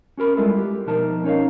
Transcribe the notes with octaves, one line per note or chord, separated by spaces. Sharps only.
C#4 F#4 A#4 B5
G3 G#3 B3 E4 F4 A4
G4
B2 F3 D#4 A#4 A5
C#4 D#4 C#5 D#5 F5